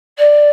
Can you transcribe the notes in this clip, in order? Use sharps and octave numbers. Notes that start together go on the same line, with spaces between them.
D5